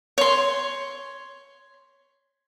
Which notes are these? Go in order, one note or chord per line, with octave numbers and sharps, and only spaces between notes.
C#5 C6